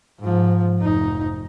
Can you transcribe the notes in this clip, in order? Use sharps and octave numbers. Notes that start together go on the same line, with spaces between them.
G#2 F3
F1 D#4